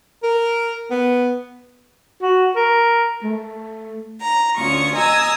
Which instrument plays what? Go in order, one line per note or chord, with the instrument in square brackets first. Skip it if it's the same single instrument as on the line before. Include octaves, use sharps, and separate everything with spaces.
[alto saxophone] A#4
B3
[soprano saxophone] F#4
A#4
A3
[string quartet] A#5
D2 C#4 F4 C#6 D#6
D#5 G#5 A#5 D#6 E6